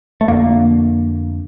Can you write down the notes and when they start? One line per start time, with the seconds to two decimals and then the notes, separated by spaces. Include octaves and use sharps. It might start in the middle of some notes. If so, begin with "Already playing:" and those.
0.21 A3
0.28 F2 D3 A#3